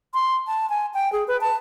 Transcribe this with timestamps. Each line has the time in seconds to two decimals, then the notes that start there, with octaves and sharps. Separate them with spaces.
0.14 C6
0.47 A5
0.69 G#5
0.94 G5
1.12 G#4
1.28 B4
1.41 A5